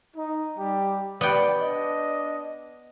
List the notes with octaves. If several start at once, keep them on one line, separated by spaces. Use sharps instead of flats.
D#4
G3 G4
B3 G4 D5 G5
D4 D#5